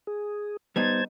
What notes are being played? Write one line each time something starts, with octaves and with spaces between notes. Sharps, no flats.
G#4
G3 B3 D#4 C5 A5 G#6